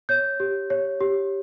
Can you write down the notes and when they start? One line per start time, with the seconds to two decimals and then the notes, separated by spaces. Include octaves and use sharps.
0.09 C#5 G6
0.40 G4
0.70 C#5
1.00 G4